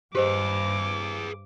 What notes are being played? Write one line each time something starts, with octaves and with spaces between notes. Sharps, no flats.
G2 G4 G#4 B4 C5 D#5 D6